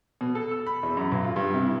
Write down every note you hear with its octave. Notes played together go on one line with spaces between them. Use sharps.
B2
A4
E6
B5
E2
F#2
B1
F4
G2
C3
E4